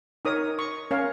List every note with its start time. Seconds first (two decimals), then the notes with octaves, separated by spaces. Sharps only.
0.25 D#4 A#4 C#5 D#6
0.59 C#6
0.91 C#4 A#4 C#5 F5